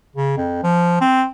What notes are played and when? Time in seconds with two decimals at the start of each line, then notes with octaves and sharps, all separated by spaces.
0.16 C#3
0.37 F2
0.63 F3
1.01 C4